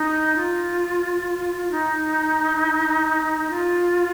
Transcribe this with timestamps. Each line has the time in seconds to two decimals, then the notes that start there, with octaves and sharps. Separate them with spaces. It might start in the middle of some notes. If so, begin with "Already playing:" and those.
Already playing: D#4
0.36 F4
1.71 D#4
3.50 F4